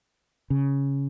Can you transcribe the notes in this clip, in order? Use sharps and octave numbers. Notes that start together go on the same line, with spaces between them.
C#3